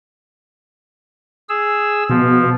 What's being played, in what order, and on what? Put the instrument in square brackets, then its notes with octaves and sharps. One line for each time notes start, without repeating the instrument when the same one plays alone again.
[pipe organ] G#4 E6
[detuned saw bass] B2 [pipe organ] F3